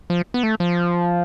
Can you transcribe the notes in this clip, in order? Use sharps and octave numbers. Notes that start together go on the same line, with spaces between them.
F3
B3
A3
F3